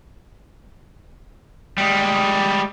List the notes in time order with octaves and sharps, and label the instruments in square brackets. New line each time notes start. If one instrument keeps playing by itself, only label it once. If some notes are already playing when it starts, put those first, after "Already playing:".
[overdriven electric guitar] G3 G#3